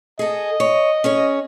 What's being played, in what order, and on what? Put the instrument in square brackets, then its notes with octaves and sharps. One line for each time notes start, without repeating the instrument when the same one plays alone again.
[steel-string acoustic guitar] G#4 A4 [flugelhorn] D#5
[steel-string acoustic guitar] C#5
C#4 G#4 C#5